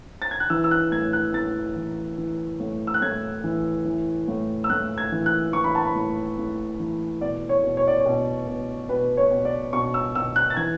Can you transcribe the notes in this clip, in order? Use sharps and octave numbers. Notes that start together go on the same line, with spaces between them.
A6
G#6
F#6
E3 E6
E6
F#6
A2 G#6
F#6
A2 A6
E3
E3
A2
E6
F#6
A2 G#6
E3
E3
A2
E6
A2 F#6
G#6
E3
F#6
E3 C#6
B5
A5
B5
A2
A2
E3
B2 D5
C#5
B2
C#5
D5
C#5
B2
B2
B2 B4
C#5
B2
D5
B2 C#6
E6
B2 E6
F#6
A6
E3 G#6